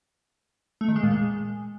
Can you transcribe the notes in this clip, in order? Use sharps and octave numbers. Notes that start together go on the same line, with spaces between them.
A3
D#3
G#3
A#2
G#3